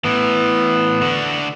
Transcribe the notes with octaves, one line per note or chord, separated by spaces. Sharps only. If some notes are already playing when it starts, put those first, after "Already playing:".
A2 E3 B3
D3 F#4